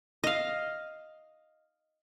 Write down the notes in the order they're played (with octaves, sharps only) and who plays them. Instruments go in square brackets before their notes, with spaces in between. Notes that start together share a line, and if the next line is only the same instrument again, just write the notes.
[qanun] D#5 F5